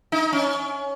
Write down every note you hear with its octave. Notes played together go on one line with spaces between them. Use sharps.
D#4
C#4